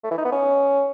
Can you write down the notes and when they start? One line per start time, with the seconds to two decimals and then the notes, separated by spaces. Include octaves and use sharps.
0.04 A3
0.11 E3
0.18 D#4
0.25 B3
0.32 C#4